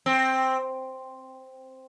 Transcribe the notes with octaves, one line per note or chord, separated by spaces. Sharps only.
C4